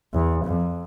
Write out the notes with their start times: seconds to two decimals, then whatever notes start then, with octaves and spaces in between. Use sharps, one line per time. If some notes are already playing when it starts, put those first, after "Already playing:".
0.14 E2
0.45 F2